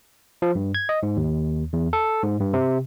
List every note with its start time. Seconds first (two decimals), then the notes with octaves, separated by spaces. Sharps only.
0.42 F3
0.55 G2
0.75 G#6
0.89 D#5
1.03 G#2
1.17 D#2
1.73 E2
1.93 A4
2.23 G#2
2.40 G2
2.53 C3